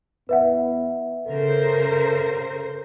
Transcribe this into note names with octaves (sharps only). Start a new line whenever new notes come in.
E2 B3 B4 E5 F#5
C#3 A4 A#4 C5